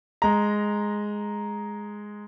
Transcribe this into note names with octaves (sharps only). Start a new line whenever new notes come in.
G#3 A#5